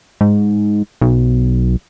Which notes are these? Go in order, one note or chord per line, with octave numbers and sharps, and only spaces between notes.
G#2
B1